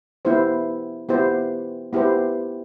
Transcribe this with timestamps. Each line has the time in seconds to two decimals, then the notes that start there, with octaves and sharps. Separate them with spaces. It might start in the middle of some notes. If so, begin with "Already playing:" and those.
0.25 B3 E4 G4 C5
1.09 B3 E4 G4 C5
1.93 B3 E4 G4 C5